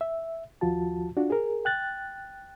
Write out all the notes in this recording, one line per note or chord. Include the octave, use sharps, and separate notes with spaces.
E5
D#2 F3 F4 F#4 A5
D4 F4 F#4
G#4 A#4
G5 F#6 A6